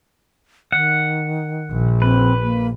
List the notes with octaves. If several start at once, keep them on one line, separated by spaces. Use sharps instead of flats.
D#3 F#5
A#1
C4 B4
A#3